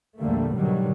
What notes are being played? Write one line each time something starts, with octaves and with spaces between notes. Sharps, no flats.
A#1 E2 D3 G3 A3 A#3
G#2 B2 D3 D#3 F#3 G3